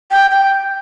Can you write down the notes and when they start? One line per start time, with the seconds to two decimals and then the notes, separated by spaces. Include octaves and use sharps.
0.11 G5
0.30 G5